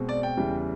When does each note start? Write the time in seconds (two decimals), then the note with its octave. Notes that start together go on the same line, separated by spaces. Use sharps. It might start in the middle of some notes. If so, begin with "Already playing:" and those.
Already playing: B2 G#3 C4
0.09 D5
0.23 G5
0.37 E2 C#3 E3 G3